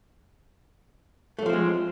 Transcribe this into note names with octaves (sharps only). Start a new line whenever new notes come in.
F3 F#3 G#3 A3 C4